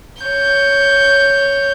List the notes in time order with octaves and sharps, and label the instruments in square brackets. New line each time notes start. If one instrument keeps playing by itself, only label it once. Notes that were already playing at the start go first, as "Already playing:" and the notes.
[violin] C#5 G6